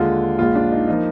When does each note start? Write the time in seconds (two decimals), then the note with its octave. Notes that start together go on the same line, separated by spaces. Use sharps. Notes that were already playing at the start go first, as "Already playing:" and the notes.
Already playing: D#2 D3 G#3 F4
0.38 A#1 A#2 G#3 F4
0.55 D4
0.72 D#4
0.88 F3 A#3 D#4